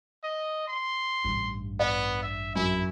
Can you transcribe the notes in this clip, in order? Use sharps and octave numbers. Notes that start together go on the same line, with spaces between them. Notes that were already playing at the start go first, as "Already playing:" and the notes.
D#5
C6
A1 G2
B3 D5
E5
F#2 E4